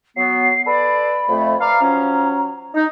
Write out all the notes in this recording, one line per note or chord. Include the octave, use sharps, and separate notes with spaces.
F#3 B3 C7
A4 B4 D5 B5
F2 A3
B4 D5 F5 A#5
F3 F#3 C#4
D#4